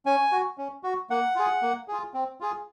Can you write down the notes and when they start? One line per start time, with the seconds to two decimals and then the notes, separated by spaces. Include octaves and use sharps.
0.06 C#4 G#5
0.32 F#4
0.58 C#4
0.83 F#4
1.10 A#3 F#5
1.36 F4 G#4
1.62 A#3
1.88 F4 G#4
2.14 C4
2.40 F4 G#4